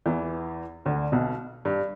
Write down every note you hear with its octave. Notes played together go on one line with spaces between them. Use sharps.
E2 E3
D2 D3
B1 B2
G2